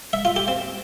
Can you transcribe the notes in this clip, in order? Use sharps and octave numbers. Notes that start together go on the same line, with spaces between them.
E5
F4
G4
C4